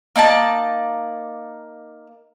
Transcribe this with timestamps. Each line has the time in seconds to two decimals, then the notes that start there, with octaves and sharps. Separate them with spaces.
0.16 A#3 D#4 D5 A5